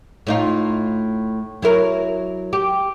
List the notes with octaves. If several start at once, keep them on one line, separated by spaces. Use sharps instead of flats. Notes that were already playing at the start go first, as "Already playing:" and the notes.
A2 D#4 F4
F#3 E4 A#4
G4